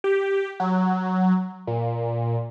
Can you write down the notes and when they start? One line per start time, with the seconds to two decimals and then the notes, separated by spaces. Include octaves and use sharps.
0.04 G4
0.60 F#3
1.67 A#2